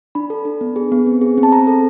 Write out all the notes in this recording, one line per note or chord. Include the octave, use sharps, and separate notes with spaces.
D4 B5
A4
D4
B3
G#4
B3
C4
G#4
C4
A5
C4 A#5
A4